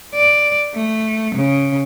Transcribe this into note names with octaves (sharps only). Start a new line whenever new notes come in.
D5
A3
C#3